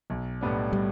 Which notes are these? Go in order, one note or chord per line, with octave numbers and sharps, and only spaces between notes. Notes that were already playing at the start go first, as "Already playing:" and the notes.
B1
A2 G3 B3 D4
G3